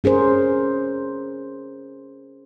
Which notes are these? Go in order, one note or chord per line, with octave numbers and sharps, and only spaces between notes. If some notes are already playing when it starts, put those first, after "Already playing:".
C#4 G#4 A#4 C5